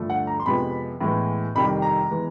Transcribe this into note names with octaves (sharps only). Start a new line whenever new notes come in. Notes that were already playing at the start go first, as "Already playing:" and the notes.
Already playing: G2 D3 F3 A3
F#5
A#5
C6
F2 C3 F3 G#3 B3 B5
A2 E3 G#3 B3
F2 C3 D#3 G3 B5
A#5
E3 G#3 B3